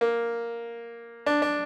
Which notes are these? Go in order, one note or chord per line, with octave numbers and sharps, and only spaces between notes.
A#3
D4
D4